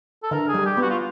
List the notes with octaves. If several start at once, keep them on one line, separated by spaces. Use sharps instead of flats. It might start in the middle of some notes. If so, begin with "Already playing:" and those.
A4
D3 A#4
G#4
G3
G4
B3
F#4
F4